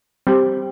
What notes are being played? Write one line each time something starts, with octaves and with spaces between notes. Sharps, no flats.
G3 C4 G4